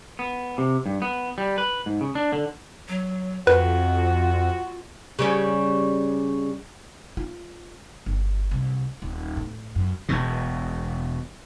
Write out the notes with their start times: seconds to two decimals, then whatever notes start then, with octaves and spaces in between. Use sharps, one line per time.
0.19 B3
0.58 C3
0.86 G2
1.02 B3
1.38 G3
1.58 B4
1.86 G#2
2.01 C#3
2.15 D4
2.33 D3
2.88 F#3
3.47 F2 F4 F#4 B4
5.19 C#3 G3 C#4
7.17 F4
8.06 G1
8.51 C2
9.02 D#1
9.37 A2
9.75 F#2
10.09 E1 E2 B2